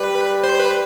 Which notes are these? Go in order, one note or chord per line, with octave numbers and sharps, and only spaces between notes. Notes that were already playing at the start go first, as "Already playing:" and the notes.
Already playing: G3 B4
C5
B4